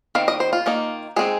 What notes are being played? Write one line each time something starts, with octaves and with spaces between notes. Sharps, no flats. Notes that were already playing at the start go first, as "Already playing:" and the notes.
D#3 C4 F5
D#5
C5
F4
D#3 A#3 D#4
G#3 C4 D#4 G#4